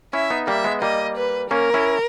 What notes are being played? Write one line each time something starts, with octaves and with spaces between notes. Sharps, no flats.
C#4 E4 E5
B3 D#4
G3 A#3 E5
G#3 B3
G3 A#3 D#5
B4
A#3 C#4 A#4
C#4 E4